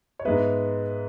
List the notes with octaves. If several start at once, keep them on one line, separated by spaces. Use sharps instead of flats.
C#5
G#2 G#3 B3 B4 E5